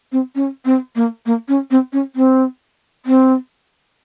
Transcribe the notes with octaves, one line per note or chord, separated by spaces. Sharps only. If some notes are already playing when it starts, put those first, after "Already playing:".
C4
C#4
C4
A#3
A#3
C#4
C4
C#4
C4
C4